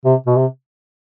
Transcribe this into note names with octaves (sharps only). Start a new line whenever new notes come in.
C3
B2
C3